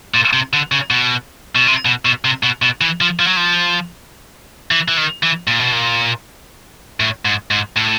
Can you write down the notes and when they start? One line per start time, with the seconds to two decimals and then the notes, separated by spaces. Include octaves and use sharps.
0.14 A#2
0.33 C3
0.53 D3
0.72 C#3
0.91 B2
1.55 B2
1.67 C3
1.85 B2
2.05 B2
2.25 C3
2.43 B2
2.62 B2
2.81 E3
3.01 F3
3.19 F3
3.27 F#3
3.36 F3
4.71 E3
4.88 E3
4.97 D#3
5.23 E3
5.48 A#2
5.59 B2
5.73 A#2
7.00 A2
7.25 G#2
7.51 G#2
7.76 A2